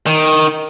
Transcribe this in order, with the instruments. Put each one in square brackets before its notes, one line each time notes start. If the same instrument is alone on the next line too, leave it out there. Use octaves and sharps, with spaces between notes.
[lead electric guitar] D#3